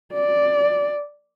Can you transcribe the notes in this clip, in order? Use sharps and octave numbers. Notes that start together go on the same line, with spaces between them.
D5